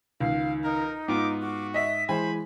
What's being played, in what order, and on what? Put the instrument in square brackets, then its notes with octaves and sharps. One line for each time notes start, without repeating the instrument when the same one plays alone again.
[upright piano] C#2 [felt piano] D#3 [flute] F5
[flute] D#4 [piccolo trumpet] A#4
[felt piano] G#2 [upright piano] B3 F4 [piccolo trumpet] D6
[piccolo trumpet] F#4 [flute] D6
[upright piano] D#5 E5 [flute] B6
[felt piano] E3 G#3 [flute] C5 [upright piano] G#5 [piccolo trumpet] B5